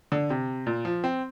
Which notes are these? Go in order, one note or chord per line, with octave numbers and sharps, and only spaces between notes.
D3
C3
A#2
F3
C4